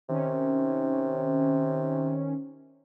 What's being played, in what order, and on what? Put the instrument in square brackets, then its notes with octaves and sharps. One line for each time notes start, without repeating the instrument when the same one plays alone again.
[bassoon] C3 [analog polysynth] D#3 C#4